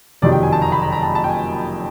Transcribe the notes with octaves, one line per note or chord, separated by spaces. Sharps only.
F#1 F2 C3 D#3 F#3 D5
G5
G#5
A5
A#5
B5
A#5
A#5
A5
A5
G5
G#5